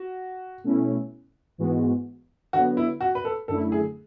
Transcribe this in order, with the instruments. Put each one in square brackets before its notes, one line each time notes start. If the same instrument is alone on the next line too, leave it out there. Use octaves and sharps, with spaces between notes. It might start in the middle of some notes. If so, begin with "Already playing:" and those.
Already playing: [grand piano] F#4
[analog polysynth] B2 A3 C#4 E4
G#2 E3 G#3 B3 F#4
[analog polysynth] D3 F#3 B3 [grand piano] F#4
[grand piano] E4
F#4
B4
A4
[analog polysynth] F#2 D3 A3 E4 [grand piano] A4
[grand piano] G#4